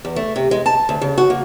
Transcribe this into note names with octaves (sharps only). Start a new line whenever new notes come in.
E2
A3
C3
G#3
A5
D2
C#3
F#4
A#3